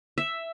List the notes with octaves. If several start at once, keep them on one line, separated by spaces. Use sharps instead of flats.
E5